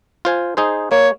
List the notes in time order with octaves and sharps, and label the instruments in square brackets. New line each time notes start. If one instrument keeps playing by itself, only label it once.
[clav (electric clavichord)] F4 C5 G#5
D#4 G#4 C5
[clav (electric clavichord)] A#3 [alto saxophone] C#5